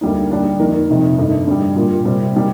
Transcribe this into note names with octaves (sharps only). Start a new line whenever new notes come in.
D2 D3 G3 A#3 D#4
D3 G3 D4 G4
F2 D#3 A#3 D#4 A#4
F2 C3 D#3
G2 D3 A3 D#4
G2 D3 G3
A#2 G3 A#3 F4
C3 G3 C4
D#3 G3 A#3